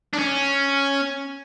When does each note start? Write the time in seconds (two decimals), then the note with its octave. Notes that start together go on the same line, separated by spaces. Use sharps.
0.13 D4
0.18 C#4